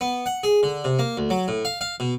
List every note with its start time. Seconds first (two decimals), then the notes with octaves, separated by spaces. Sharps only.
0.01 B3
0.26 F#5
0.43 G#4
0.63 D3
0.84 C3
0.99 A#3
1.17 D2
1.30 F#3
1.48 A2
1.65 F5
1.81 F5
2.00 B2